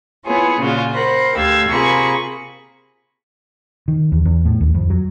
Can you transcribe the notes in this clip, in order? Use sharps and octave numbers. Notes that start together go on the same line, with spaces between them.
B3 E4 F4 G#4 C#5
A#2 C#3 C#4 F4 F#4
A#4 C5 F#5 B5
D2 G4 F5 E6 G#6 A6
C3 A#3 F4 G#4 B5 C#6
D#3
E2
E2
A2
D#2
F2
F#3